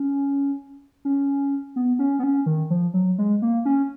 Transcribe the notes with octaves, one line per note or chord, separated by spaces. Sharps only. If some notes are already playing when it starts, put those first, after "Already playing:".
Already playing: C#4
C#4
B3
C#4
B3
C#4
D#3
F3
F#3
G#3
A#3
C#4